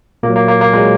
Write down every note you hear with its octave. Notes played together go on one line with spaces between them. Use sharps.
A#2 A#3
F#3
A#3
A#3
A#3
A#2 F#3 G#3